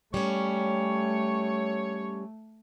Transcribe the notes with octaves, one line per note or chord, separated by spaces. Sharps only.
G3 A3 C#4 C#5